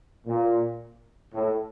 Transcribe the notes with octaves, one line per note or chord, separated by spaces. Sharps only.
A#2
A2